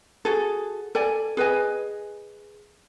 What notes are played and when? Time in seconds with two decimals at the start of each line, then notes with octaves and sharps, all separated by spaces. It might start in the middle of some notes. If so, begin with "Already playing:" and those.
0.25 F#4 G#4 A4
0.95 A4 D5 G#5
1.37 G#4 B4 D#5 G#5